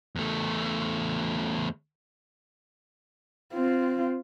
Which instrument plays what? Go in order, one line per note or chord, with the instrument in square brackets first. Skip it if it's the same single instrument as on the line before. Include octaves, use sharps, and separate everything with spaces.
[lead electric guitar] E2 A3
[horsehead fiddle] C4 F4